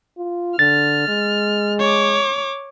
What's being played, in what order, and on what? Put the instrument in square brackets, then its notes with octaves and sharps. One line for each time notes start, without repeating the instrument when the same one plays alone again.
[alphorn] F4
[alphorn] D3 [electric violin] F6 [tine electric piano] A6
[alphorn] G#3
[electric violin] C#5 D6